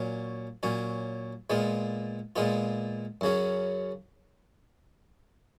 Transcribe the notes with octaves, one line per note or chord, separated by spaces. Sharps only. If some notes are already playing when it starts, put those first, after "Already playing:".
Already playing: A#2 F#3 C#4
A#2 F#3 C#4
A#2 G#3 B3 F4
A#2 G#3 B3 F4
F#2 C#3 F#3 C#4